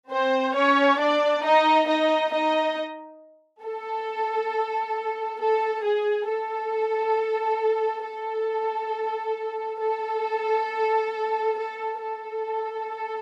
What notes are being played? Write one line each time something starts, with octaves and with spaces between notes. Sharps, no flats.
C4 C5
C#4 C#5
D4 D5
D#4 D#5
D#4 D#5
D#4 D#5
A4
A4
G#4
A4
A4
A4
A4
A4